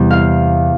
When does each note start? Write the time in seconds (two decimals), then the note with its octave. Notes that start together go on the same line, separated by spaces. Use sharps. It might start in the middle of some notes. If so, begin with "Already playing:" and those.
Already playing: E2 C3 G3
0.11 F5